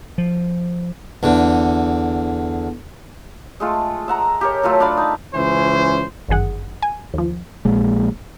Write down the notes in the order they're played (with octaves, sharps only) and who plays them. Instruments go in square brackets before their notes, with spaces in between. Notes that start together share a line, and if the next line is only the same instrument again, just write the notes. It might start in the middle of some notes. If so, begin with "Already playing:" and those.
[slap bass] F3
[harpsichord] E2 D3
[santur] G#3 A3 F4
E5 F#5 A#5
G4 A#4 C#5
F#3 A3 F4 A4
D4 D5 F5 B5
D#4
[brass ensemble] C#2 E3 C#4 C5
[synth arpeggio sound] G1 F#2 D#3 G#4 F#5
G#5
D#2 F3
[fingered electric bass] A#1 A#2 G#3